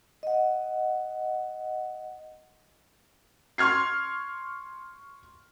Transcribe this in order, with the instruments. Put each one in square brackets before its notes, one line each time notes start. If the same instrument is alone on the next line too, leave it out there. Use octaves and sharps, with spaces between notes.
[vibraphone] D#5 F#5
[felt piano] C6 C#6 F6 G#6 C7